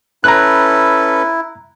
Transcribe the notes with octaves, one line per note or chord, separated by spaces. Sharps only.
C#4 E4 A4 B4 A#5 F#6